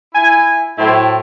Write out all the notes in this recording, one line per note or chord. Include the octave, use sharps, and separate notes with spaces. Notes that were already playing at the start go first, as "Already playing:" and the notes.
E4 G#5
A2 F#3 E4 C5 G5